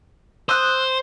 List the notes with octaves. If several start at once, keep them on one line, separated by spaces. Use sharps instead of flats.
C5 D#6 E6 F#6